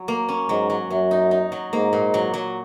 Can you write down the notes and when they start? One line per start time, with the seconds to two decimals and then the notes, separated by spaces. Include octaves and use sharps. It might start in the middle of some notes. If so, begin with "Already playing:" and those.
Already playing: F#3
0.08 A#3
0.29 C#4
0.49 G#2 F#3
0.70 F#3
0.90 F#2 F#3
1.11 D#4
1.31 D#4
1.52 F#3
1.72 G#2 A#3
1.93 A#2
2.14 F#3
2.34 F#3